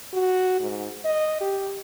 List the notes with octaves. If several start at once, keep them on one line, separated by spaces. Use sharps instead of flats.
F#4
G#2
D#5
G4